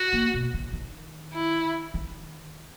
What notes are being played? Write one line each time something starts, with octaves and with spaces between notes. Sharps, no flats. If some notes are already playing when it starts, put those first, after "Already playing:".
Already playing: F#4
A#3
B2
C#3
D#3
E4
D#3